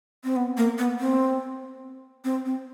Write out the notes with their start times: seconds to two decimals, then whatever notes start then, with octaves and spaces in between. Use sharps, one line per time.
0.24 C4
0.36 B3
0.57 A#3
0.78 B3
0.99 C4
2.25 C4
2.46 C4